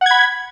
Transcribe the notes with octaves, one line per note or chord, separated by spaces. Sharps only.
F#5 B5 G#6